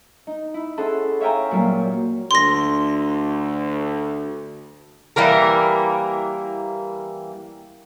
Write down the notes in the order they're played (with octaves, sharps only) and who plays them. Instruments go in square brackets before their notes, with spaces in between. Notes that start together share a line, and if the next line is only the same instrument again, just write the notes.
[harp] D#4
E4
C#4 G#4 A4 E5 F#5 C6
C#5 E5 F5 G5 G#5 A#5
A#2 F#3 G3 A#3
[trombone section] D2 [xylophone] C6 A#6
[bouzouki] E3 G3 A#3 A#4